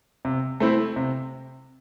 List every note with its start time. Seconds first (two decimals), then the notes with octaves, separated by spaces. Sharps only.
0.25 C3
0.60 A3 C4 E4
0.96 C3